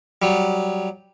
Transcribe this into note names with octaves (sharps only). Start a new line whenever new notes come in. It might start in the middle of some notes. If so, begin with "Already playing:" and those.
F#3 G3